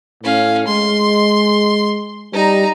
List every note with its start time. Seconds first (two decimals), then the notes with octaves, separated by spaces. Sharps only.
0.23 A2 C#4 F5
0.68 G#3 C6
2.33 G3 D#4 A#5